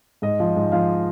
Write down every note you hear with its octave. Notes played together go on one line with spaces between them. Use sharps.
G#2 D#5
F3
G#2
F3 F5